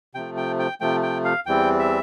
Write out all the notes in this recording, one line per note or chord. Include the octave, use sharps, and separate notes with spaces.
C3 F3 A3 G5
G5
G5
C3 F3 A3 G5
G5
F5
E2 E3 G3 C4 G5
E5